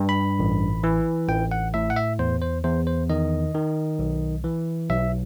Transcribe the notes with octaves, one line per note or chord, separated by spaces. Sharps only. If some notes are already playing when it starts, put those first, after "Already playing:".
Already playing: G2
B5
A1
E3
A1 G5
F#5
A2 E5
F#5
E5
E2 C5
C5
E2 C5
C5
D#3 D#5
D#3
B1
E3
B1 E5